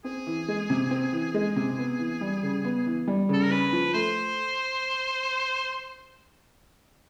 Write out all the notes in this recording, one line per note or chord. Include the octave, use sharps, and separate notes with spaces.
C4 G#4
E3
G#3
C3
C4
E3
G#3
C3
B3
E3
G3
C#3
B3
E3
G3
C#3 A4
A#4
C#4 B4
F3
A3 C5